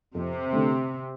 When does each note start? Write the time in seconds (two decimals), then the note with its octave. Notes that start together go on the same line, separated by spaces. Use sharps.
0.15 F2 C3
0.53 D3 A3